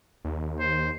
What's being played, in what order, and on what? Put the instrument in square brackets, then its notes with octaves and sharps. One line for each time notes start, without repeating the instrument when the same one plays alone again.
[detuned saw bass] D#2
[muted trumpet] C5